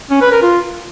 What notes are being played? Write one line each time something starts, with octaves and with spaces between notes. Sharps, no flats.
C#4
B4
A#4
F4